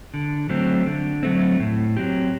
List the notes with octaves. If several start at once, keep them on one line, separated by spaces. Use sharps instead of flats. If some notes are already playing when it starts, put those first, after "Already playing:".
D3
F#3 A3 C4
D3
F#3 A3 C4
A2
F#3 C4 G4